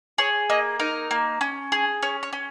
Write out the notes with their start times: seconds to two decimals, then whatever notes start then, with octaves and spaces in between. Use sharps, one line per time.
0.18 G#4 C#5
0.50 A#3 D#5
0.80 D#4 A#4
1.11 A#3
1.41 C#4
1.72 G#4
2.02 C#4 C#5
2.23 C#5
2.33 C#4